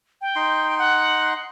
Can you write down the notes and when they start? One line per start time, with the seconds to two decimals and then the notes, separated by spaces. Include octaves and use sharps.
0.21 G5
0.36 D#4 C6
0.78 F#5